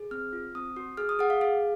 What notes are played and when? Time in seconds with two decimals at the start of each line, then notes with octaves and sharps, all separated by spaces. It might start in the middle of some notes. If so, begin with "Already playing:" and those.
Already playing: G#4
0.11 C4 F6
0.33 F4
0.55 C4 D#6
0.76 F#4
0.97 G#4 F6
1.09 D#6
1.19 G#4 F#5
1.30 F5
1.41 G#4 F5